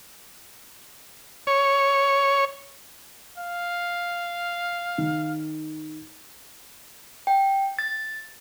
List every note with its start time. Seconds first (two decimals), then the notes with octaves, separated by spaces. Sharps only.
1.47 C#5
3.38 F5
4.98 D#3
7.27 G5
7.79 A6